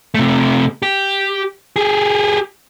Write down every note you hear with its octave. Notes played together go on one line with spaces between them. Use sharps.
C3 A3
G4
G4 G#4